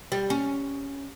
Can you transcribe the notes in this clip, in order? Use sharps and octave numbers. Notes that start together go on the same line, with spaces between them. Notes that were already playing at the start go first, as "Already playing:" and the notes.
G3
C#4